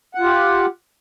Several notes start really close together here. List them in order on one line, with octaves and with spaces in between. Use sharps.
F#5 F4 G4